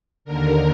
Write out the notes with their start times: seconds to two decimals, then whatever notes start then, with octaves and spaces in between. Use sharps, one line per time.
0.25 D#2 D3 A#4